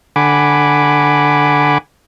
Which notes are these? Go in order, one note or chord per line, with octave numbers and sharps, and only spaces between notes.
D3 F#5 G#5 B5 D6